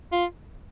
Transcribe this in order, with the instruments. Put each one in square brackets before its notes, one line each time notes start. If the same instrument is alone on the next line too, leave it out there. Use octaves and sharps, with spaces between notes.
[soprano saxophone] F4